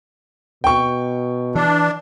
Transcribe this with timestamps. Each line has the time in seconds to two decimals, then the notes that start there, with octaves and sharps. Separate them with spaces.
0.64 B2 G5 C#6
1.55 E3 D4